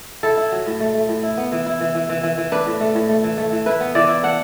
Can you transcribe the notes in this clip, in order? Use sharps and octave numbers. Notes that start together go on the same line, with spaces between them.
E4 A4
E4
F#3
A2
A3
A3
A2
E4
B3
E3
E4
E3
E3
E3
E3
E3
D4 B4
A2
A3
A2
A3
E3
A3
E3
E4 B4
B3
E3 D5
E4
D4 F#5